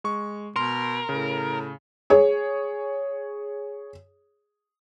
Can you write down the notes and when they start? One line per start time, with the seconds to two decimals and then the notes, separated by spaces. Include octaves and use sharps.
0.04 G#3 C#6
0.56 B2 A#4 C6
1.09 A2 C#3
2.10 G#4 C#5